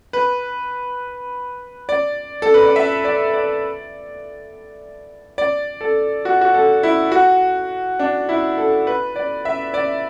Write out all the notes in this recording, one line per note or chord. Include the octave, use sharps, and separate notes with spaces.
B4
D5
A4
B4
D5
E5
D5
D5
D5
A4
F#4
F#4
A4
E4
F#4
D4
E4
A4
B4
D5
E5
D5